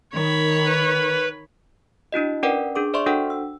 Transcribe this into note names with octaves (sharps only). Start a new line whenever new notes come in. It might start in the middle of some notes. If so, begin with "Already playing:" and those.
D#3 C#5 B5
B4
D4 E4 F#4 D#5
C#4 A#4 B4 D5 F#5 G5
D4 G#4 D6
C5 D5 E5 C6 C#6
D4 F#4 A4 C5 F#5 G5
E6